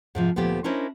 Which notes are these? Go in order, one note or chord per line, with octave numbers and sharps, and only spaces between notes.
G#2 C3 F3
D2 A#2 F3 B3 G4
C#4 D4 E4 A#4 C5 D#5